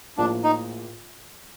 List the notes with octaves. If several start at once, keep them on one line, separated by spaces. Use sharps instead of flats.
A#1 A2 F3 A#3 D4
D#4